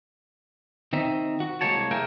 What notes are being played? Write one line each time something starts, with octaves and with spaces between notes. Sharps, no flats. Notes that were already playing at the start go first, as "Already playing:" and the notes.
D#3 C4 D#4 E5
F#4
C2 E3 G#3 A#3 C#5 A5
A#3 G#4 A#4 E5 G5